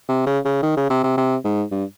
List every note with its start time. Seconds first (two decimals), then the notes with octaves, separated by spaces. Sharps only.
0.09 C3
0.26 C#3
0.45 C#3
0.63 D#3
0.77 C#3
0.90 C3
1.03 C3
1.17 C3
1.45 G#2
1.71 G2